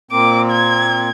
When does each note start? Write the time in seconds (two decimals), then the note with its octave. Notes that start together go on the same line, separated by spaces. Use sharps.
0.11 A#2 A#3 C4 D6
0.51 G#6